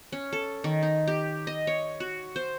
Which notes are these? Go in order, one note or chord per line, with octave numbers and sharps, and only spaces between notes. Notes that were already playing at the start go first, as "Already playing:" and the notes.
C#4
A4
D#3
D#4
G4
D#5
C#5
F#4
C5